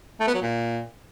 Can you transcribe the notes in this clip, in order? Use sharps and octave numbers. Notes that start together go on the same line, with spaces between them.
A3
B3
F#3
A#2